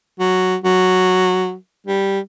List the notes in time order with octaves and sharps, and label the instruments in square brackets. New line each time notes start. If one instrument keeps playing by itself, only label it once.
[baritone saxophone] F#3
F#3
G3